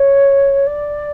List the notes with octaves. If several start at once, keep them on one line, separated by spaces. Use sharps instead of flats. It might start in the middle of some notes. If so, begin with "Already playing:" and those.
Already playing: C#5
D5